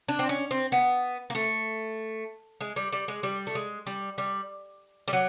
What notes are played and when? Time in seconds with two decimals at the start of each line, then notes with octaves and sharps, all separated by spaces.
0.08 D4
0.19 C4
0.29 C#4
0.51 C4
0.72 B3
1.30 A#3
1.35 A3
2.61 G#3
2.76 G3
2.93 G3
3.08 G#3
3.23 G3
3.47 A3
3.55 G#3
3.87 G3
4.18 G3
5.08 G3
5.13 F#3